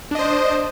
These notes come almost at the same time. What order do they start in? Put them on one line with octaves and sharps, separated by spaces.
D4 D#5 C5